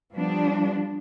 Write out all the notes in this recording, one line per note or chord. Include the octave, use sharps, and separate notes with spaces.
F3 G3 B3 D4